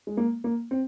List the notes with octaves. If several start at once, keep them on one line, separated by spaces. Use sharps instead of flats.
G#3
A#3
A#3
C4